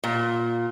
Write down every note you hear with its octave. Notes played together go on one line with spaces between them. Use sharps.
A#2